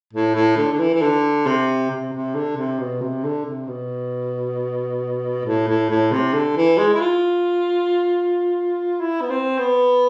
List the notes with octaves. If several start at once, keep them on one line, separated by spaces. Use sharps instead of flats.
A2
A2
D3
D3
E3
E3
D3
C3
C3
C3
D3
C3
B2
C3
D3
C3
B2
A2
A2
A2
C3
D3
E3
G#3
E4
F4
E4
B3
C4
B3